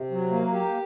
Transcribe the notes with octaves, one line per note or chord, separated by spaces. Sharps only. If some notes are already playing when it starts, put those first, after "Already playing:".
Already playing: C3
F#3
A#3
G4